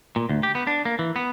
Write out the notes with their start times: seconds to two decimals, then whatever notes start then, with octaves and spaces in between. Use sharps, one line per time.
0.16 A#2
0.29 D2
0.43 G4
0.55 B3
0.67 D4
0.85 A#3
0.99 E3
1.16 B3